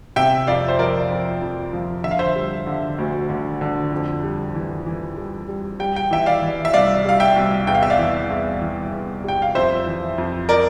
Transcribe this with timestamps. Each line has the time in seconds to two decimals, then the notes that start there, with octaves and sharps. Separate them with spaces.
0.16 C3 E5 G5
0.47 F2 D5 F5
0.68 C5
0.79 F3 A#4 D5
1.10 F2
1.41 F2
1.73 F3
2.04 D3 E5
2.11 F5
2.19 C5 E5
2.35 G3
2.67 D3
2.98 D2
3.29 D3
3.61 D3
3.92 F2
4.24 G3
4.55 E3
4.86 E3
5.17 G3
5.48 G3
5.80 G3 G5
5.96 G5
6.11 E3 E5 G5
6.26 D5 F5
6.42 E3
6.65 E5
6.73 C2 D5 F5
7.05 G3 F5
7.20 E5 G5
7.36 C2
7.67 E2 G5
7.75 F5
7.83 E5
7.90 D5 F5
7.98 E3
8.30 E2
8.61 E3
8.92 E2
9.24 G3 G5
9.42 F5
9.55 F2 C5 E5
9.86 E3
10.18 F2
10.49 A#4 D5